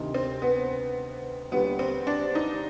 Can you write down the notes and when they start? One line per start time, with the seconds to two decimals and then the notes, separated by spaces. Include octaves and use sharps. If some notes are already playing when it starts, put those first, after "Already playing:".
Already playing: D2 C3 D#3
0.14 C4
0.42 B3
1.52 D#2 D3 G3 B3
1.79 C4
2.07 D4
2.35 D#4